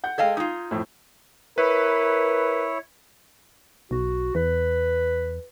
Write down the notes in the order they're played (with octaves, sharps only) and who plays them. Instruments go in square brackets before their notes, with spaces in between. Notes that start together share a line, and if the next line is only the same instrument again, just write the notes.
[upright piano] F#5 G6
[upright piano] G#3 G5 G#6 [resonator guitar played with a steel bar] A4 D#5 F5
[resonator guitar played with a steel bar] D#4 F4 [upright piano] D#6
[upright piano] F2 A2
[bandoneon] E4 C#5 [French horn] A#4 [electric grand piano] B4
[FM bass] B1 [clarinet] F#4
[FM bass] E2 [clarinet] B4